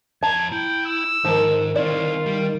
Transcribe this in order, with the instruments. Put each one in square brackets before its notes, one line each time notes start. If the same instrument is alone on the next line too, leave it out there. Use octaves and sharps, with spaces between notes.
[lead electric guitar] F2 A#5 [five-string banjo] A5 [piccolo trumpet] G#6
[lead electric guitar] E4 [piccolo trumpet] G5
[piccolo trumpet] E6
[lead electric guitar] G#2 [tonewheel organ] D#3 [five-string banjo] F3 A#4
[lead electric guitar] C4 E4 [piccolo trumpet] F4 [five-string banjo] D5
[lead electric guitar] G3